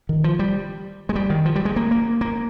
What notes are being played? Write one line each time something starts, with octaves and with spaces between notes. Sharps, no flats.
D#3
F3
G3
G#3
G3
D#3
F3
G3
G#3
A#3
A#3
A#3